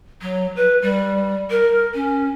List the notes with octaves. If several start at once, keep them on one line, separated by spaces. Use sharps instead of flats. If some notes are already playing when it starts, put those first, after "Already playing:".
F#3
B4
G3
A#4
C#4